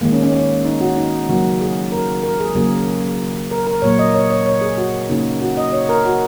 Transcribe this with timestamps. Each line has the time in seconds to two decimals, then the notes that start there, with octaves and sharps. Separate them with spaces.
0.01 D#3 G#3 A#3
0.13 C#4
0.23 C#4
0.33 C#4
0.65 D#4
0.81 F#4
0.97 D#4
1.29 C#3 F#3 A#3 F#4
1.61 G#4
1.92 A#4
2.23 A#4
2.40 G#4
2.55 C#3 F#3 A#3 G#4
3.51 A#4
3.67 A#4
3.82 A#2 F#3 A#3 C#5
3.99 D#5
4.14 C#5
4.30 C#5
4.46 C#5
4.61 G#4
4.77 F#4
5.10 C#3 A#3 D#4
5.41 F#4
5.57 D#5
5.72 C#5
5.89 A#4
6.05 F#4